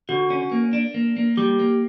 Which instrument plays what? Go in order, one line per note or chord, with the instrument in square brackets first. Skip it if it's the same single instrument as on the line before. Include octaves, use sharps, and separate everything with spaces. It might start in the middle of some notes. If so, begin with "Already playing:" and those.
[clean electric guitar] D3 [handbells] F#4
[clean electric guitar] C#4
A#3
D4
A#3
A#3
[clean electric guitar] G3 [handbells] G4
[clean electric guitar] A#3